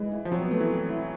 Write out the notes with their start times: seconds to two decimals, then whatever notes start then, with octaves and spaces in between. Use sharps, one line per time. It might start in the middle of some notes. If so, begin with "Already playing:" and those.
Already playing: E3 G#3
0.12 E4
0.25 F3
0.32 F#3 C4
0.42 B3
0.51 A3 B4
0.61 E3
0.70 C4
0.90 E4